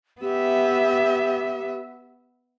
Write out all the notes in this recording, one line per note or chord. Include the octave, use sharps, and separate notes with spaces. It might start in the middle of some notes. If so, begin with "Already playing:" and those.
B3 G4 E5